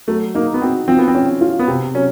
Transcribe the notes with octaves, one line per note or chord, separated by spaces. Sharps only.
F#3 A3
A#3 D#4
B3
C4 F#4
F3 C4
B3
C4
C#4
F4
B3
C3 C4
F#3 C#4